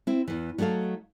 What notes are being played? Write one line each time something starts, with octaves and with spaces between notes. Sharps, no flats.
C4 E4
E2 E3
F#3 A3 D#4 A4 F5